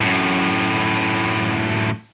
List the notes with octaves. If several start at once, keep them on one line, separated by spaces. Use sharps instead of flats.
F#2 A2